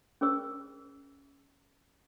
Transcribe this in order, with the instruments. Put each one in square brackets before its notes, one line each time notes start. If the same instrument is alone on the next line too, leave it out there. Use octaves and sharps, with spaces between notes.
[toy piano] C#4 G#4 A#4 C5 E6